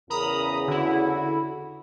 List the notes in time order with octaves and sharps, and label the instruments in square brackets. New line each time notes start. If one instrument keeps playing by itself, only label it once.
[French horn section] E2 C#3 [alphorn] A#4 [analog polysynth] A#5 B5 D#6
[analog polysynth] D3 E4 [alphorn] F#4